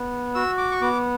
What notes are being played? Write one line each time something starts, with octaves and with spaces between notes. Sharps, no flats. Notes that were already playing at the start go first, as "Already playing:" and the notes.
Already playing: B3
F#4 E6
D6
C#6
B3 D6